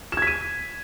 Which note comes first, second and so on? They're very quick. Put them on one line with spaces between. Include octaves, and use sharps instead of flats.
E7 G#6 B6 D#7